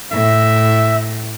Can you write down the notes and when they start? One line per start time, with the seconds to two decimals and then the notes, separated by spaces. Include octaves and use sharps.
0.12 A2 E5